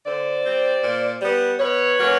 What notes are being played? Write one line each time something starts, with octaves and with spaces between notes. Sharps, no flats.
D3 C5 D5
G3 C4
A#2
G3 B3
B2 B4 C#5
F#3 A#3 C#4